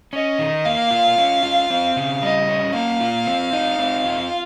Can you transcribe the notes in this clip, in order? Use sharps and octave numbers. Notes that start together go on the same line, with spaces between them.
C#4 D#5
D#3
A#3 F5
F4
C#4
F4
C4
C#3
G3 D#5
C#4
A#3 F5
F4
C4
D#4
C4
F4